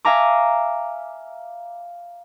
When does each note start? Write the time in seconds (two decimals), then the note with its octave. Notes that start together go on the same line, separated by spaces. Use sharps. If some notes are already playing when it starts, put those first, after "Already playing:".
0.05 E5 F5 G#5 A#5 D6